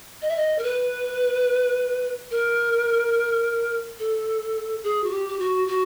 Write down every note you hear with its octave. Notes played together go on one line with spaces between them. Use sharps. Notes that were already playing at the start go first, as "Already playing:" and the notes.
D#5
E5
D#5
A#4
B4
A#4
A4
G#4
F#4
G4
G4
F#4
F#4